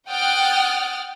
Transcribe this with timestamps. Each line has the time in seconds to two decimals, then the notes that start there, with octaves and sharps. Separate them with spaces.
0.10 F#5 G5 D#6 F6 F#6 A6